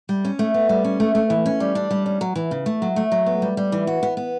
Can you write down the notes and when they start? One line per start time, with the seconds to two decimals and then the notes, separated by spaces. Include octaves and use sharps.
0.09 G3
0.25 C#4
0.39 A3
0.54 B3
0.69 G3
0.84 C#4
1.00 A3
1.15 A3
1.30 E3
1.46 C#4
1.60 G3
1.75 D4
1.91 G3
2.06 C#4
2.21 F#3
2.36 E3
2.51 C#3
2.66 A3
2.82 F#3
2.96 A3
3.12 F#3
3.26 B3
3.42 G3
3.57 G3
3.72 E3
3.87 F#4
4.03 B3
4.17 B3